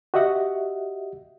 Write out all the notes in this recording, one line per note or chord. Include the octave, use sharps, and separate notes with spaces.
F#4 G4 D#5 E5 F#5